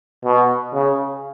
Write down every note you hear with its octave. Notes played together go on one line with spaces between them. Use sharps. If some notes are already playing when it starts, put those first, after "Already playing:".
B2
C#3